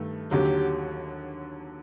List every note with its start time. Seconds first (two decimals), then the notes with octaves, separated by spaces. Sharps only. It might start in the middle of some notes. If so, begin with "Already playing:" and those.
Already playing: G2 D#3 A3
0.31 D#2 D3 F#3 G4